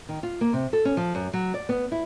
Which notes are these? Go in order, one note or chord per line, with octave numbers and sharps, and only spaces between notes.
D#3
F4
A#3
C3
A4
C#4
F3
F#2
F#3
D5
B3
E4